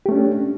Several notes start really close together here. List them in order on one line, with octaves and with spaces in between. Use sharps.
G4 A3 C#4 D4